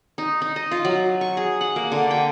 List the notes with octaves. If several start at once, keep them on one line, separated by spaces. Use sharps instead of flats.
D#4
D#4
D#5
F4
F#3
C#6
G#4
F#5
A#3
D3
G5